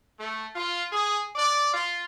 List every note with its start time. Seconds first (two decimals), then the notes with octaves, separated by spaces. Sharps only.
0.19 A3
0.55 F4
0.92 G#4
1.35 D5
1.72 F4